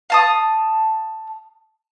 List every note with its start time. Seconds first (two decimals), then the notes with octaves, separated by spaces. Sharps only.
0.10 F5 A5 D#6